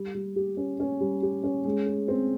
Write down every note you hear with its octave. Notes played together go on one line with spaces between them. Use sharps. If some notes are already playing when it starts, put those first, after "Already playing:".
Already playing: G3
G3
G4
C#4
C#4
G3
G4
C#4
G#3
G#4
C4